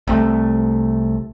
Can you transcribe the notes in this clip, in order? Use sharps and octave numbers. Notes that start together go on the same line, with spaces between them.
C2 C3 A3